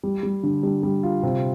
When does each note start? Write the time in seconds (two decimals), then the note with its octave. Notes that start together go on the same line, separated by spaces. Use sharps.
0.04 G3
0.23 G3
0.43 D3
0.63 G3
0.83 G3
1.03 F4
1.23 C3